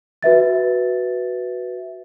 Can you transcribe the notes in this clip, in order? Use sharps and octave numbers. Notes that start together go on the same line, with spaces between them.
F#4 B4 E5 A6